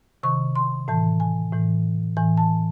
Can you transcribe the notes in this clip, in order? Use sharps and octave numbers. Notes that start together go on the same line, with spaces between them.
C3 D#3 C#6
C6
A2 E3 A5
G#5
A2 E3
A2 E3 G#5
A5